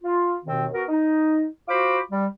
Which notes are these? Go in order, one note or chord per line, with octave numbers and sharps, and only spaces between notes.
F4
D#2 B2 D#3 C4
B3 F#4 A#4
D#4
F4 F#4 C5 B5 D6
G3